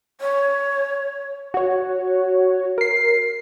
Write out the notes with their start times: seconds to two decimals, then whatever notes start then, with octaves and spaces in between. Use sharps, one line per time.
0.21 C#5
1.54 F#4 C#5
2.78 A#4 C7